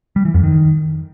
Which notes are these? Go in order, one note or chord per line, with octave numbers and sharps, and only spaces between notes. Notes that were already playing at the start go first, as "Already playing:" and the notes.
G3
E3
F2
D#3